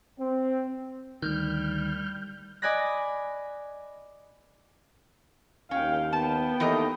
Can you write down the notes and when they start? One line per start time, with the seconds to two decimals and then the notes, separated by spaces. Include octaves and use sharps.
0.19 C4
1.22 D2 D#3 G3 F6 G6
2.62 D5 D#5 G#5 B5 F#6 A#6
5.71 D#2 C#4 F5 G5
6.13 B3 G5 A5
6.60 D#2 E3 A3 D#4 A#4 D#5